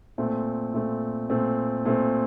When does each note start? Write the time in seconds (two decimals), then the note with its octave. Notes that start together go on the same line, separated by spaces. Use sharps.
0.18 A#2 A3 C4
0.74 A#2 A3 C4
1.30 A#2 A3 C4
1.85 A#2 A3 C4